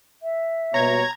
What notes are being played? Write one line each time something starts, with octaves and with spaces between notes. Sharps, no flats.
E5
B2 G3 A#3 C#5 A#5 G#6